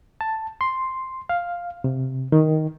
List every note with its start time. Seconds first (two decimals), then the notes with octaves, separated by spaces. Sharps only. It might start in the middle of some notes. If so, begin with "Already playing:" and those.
0.21 A5
0.61 C6
1.29 F5
1.84 C3
2.32 D#3